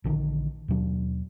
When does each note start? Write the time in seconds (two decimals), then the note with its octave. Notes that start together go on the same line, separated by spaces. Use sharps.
0.04 A#1 D3 D#3
0.68 D#2 B2 F#3 D4